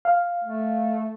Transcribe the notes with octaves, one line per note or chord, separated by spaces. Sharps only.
F5
A3